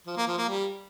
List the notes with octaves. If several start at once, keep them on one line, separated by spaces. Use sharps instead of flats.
F3
A#3
F3
A#3
G3